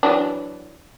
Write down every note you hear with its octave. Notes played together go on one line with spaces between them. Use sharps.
E3 F#3 D4